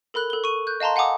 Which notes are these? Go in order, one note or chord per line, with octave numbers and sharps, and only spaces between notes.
A4 A#4 B5 F#6
A4 G7
C#6 D#7
F#6 G6
D#5 F5 A5 A#5 C6
F5 F#5 G#5 A#5 D6 D#6